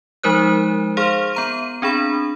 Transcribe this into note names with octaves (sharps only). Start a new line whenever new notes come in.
F3 G#3 D#4 A#4 C5 F#6
G#4 C5 F5 C6 F6
B3 A#5 D#7
C4 D4 G#4 B5